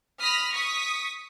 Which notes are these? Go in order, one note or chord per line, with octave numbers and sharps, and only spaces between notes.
B5 D#6 F6 A#6 B6
C#6 D#6 B6